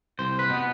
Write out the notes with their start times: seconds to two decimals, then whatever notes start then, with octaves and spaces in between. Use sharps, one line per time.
0.19 C2 C5
0.39 B4
0.50 B2 B3